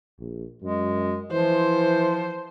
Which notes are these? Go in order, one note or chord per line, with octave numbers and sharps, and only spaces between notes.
A#1
F#2 G#3
E3 F3 C5